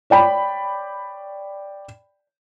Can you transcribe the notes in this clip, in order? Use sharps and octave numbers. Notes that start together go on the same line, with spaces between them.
C#5 D5 G5 B5